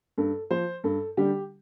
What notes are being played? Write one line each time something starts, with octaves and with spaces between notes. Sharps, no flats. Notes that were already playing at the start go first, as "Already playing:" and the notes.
G2 A4
F3 C5
G2 A4
D3 G3 G4